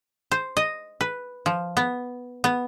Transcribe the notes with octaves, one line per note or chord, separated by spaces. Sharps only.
C5
D#5
B4
F3
B3
B3